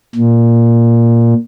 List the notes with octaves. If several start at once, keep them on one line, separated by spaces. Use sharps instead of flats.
A#2